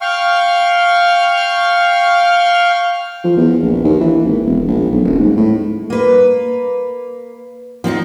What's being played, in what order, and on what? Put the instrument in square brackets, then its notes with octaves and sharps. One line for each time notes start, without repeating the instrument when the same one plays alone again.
[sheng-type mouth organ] F5 G5 C#6 F6
[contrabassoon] F3
E2
A#1
D#2
E3
G#1
E1
A#1
B1
D#1
G#2
A2
[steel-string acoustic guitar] A#3 B4
F3 C4 C#4 D#4